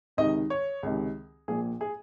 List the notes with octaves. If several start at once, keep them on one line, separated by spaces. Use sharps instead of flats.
C#2 C3 D#3 D#5
C#5
C#2 C3 D#3
A#1 A#2 F3 G#4
G#4